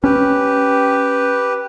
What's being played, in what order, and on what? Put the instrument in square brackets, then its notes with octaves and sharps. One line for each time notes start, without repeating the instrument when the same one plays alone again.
[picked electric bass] C#4 [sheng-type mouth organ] G4 B4